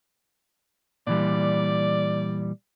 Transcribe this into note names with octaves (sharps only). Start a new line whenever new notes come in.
A#2 E3 G3 D5